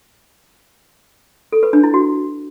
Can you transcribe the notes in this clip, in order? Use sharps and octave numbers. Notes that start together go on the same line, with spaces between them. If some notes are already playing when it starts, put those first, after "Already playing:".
A4
B4
D4
E4
F#4